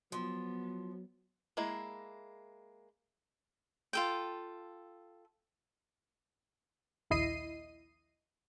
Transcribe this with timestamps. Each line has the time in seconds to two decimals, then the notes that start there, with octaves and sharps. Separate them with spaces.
0.12 F3 F#3 B3
1.57 G#3 A#3 E4
3.93 F4 A4 G5
7.10 A#1 D#2 E4 D#5 C7 D#7